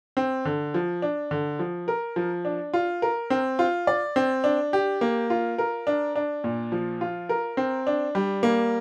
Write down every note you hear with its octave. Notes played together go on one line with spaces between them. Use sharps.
C4
D3
F3
D4
D3
F3
A#4
F3
D4
F4
A#4
C4
F4
D5
C4
D4
G4
A#3
F4
A#4
D4
D4
A#2
F3
F4
A#4
C4
D4
G3
A#3